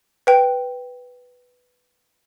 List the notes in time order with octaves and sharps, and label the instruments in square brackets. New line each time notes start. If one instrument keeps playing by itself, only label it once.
[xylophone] B4 G5